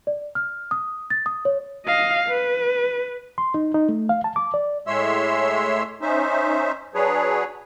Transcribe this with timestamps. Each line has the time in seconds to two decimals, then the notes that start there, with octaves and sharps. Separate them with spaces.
0.07 D5
0.35 F6
0.71 D#6
1.10 A6
1.26 D#6
1.45 C#5
1.86 D#5 F5
2.29 B4
3.38 C6
3.54 D#4
3.74 D#4
3.89 A3
4.09 F5
4.24 A5
4.36 D6
4.54 D5
4.87 A2 G#3 C#5 E5 C6 E6
6.01 C#4 D#4 C5 E5
6.95 F#3 D4 G#4 B4 C#5